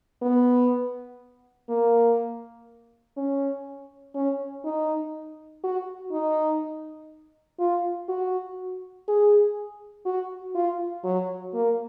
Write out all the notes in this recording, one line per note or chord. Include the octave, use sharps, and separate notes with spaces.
B3
A#3
C#4
C#4
D#4
F#4
D#4
F4
F#4
G#4
F#4
F4
F#3
A#3